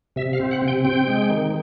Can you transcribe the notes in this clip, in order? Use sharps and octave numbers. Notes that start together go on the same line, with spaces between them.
C3 E5
F5
C4
F#5
C3
G5
C4 G5
G#3
D#3